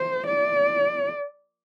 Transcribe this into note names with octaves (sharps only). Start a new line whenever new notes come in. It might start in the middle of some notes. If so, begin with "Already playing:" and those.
Already playing: C5
D5